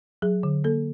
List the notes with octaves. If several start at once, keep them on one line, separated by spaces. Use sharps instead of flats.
F#3 G#4
D3
A#3 A4